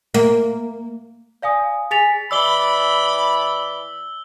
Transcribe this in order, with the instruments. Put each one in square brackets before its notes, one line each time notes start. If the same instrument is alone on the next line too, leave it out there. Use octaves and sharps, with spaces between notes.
[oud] A#3
[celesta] D5 F5 G#5 D#6
G#4 G#5 A6 B6 F7
[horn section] E3 D5 B5 [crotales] E6 G7